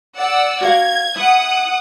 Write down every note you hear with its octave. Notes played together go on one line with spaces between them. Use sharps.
D5 F#5 E6
F#4 A#4 F5 G#6
E4 F#5 D#6